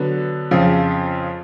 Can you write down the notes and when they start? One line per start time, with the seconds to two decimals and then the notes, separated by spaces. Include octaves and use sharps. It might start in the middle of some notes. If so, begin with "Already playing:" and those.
Already playing: D3 F#3 B3
0.51 F2 C#3 F3